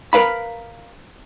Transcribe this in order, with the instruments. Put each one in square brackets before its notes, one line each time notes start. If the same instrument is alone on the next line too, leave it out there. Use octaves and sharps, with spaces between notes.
[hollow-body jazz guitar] A#4 B4 F5 B5